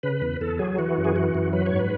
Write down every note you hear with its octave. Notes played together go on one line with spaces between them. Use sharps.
C#3 B4
E2
E2 A4
F#3 G#4
E3 F#4
F#2
G#4
E3 F#4
F#2
F#3 B4
G#2 C#5
B4